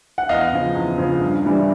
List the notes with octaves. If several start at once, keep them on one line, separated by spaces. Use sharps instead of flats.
F#5
E2 D#5 F5
C#3 F3
E2
C#3 F3
G2
E3 G3